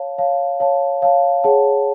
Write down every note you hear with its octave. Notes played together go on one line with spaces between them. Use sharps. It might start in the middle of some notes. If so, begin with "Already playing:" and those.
Already playing: C#5 F5 A5
C#5 F5 A5
C#5 F5 A5
C#5 F5 A5
G#4 C#5 F#5 A5